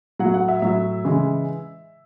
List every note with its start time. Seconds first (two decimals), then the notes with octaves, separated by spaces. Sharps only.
0.19 A2 F#3 F#5
0.34 F#5
0.48 E5
0.62 A2 F#3 E5
1.05 C#3 E3 G#3